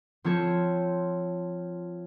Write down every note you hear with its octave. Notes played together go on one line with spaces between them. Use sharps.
F3 C4 F4 A4 C#5